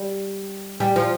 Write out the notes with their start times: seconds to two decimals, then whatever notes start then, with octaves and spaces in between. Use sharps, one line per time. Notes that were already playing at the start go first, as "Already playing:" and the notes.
Already playing: G3
0.80 G3
0.96 F3